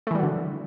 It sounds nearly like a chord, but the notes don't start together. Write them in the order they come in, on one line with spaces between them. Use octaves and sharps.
A3 E3 G3 F#3 D3